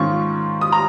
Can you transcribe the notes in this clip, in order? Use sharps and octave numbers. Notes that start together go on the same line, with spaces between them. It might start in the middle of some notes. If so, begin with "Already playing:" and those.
Already playing: G#2 D#3 C#4 F4 C#6
D#6
A#5